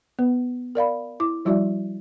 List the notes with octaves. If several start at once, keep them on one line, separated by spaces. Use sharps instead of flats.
B3 B4
A#4 D5 F5 B5
E4 D6
F3 G3 E4 F#4 D5 E5